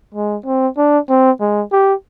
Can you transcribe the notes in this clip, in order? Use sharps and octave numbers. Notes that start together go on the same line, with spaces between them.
G#3
C4
D4
C4
G#3
G4